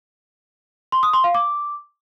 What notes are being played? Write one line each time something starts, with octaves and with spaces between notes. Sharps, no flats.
C6
D#6
C6
F5
D6